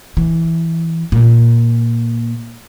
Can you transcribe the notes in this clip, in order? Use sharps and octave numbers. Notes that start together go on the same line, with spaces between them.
E3
A#2